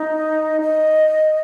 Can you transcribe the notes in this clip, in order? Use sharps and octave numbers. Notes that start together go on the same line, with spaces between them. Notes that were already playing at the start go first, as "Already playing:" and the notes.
Already playing: D#4
D#5